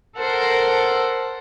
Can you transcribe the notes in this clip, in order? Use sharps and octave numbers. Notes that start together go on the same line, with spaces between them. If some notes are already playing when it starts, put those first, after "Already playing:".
A4 A#4 C5 F#5